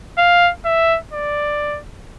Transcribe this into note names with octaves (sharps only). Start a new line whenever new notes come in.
F5
E5
D5